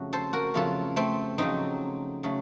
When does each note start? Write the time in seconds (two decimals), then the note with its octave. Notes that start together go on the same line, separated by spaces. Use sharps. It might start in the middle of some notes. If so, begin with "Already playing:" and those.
Already playing: F2 C#3 F#3 A3 F#4
0.13 A4 C5
0.33 F#4 A#4
0.54 F2 C#3 F#3 A3 F4 A4
0.96 A3 C4
1.38 F2 C#3 F#3 A3 C4 D#4
2.23 C#3 F#3 A3